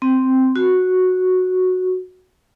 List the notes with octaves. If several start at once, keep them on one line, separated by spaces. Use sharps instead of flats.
C4
F#4